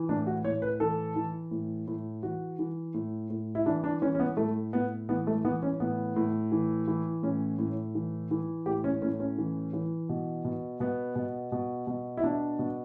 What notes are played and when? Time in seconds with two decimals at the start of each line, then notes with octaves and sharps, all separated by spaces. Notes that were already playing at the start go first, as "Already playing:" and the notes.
Already playing: E3
0.09 A2 D4
0.27 F#4
0.44 A2 C#5
0.62 B4
0.80 E3 A4
1.16 E3
1.51 A2
1.87 A2
2.23 E3 F#4
2.59 E3
2.94 A2
3.30 A2
3.55 E4
3.66 E3 D4
3.84 D4
4.02 E3 C#4
4.15 C#4
4.20 B3
4.37 A2 A3
4.73 A2 B3
5.09 E3 B3
5.27 A3
5.45 E3 B3
5.63 C#4
5.80 A2 B3
6.16 A2
6.52 E3
6.88 E3
7.23 A2 C#4
7.59 A2
7.95 E3
8.31 E3
8.66 A2 G4
8.84 C#4
9.02 A2 C#4
9.20 C#4
9.38 E3
9.73 E3
10.09 B2
10.45 B2
10.80 B2 B3
11.16 B2
11.52 B2
11.87 B2
12.17 E4
12.24 B2 D4
12.59 B2